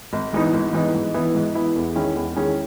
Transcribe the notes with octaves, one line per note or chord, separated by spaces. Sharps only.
G#1
G#2 E3 B3 D#4
G#1
G#2 E3 B3 D#4
G#2
E3 B3 E4
G#2
E3 B3 E4
E2
D#3 G#3 C#4 E4
E2
D#3 G#3 C#4 E4